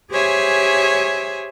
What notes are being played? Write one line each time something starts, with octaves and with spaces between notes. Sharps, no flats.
G4 G#4 C5 C#5 E5 G#5